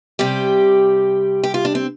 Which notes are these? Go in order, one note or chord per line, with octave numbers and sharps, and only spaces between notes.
C3 G3 G4
G4
F4
D4
C4